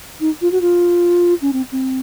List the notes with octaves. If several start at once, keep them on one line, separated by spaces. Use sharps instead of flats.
D#4
F4
F#4
F4
C#4
C4
C4